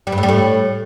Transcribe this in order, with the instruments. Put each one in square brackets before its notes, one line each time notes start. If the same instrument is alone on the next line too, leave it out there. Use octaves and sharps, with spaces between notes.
[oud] G3
G2
A2
G3
A2